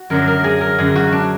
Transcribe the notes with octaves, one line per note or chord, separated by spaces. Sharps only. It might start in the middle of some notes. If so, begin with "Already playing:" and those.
Already playing: F#4
F#2 D3 F#3 A#4
A#4
G#4
A#4
F#2 D3 F#3 G#4
F#4
D4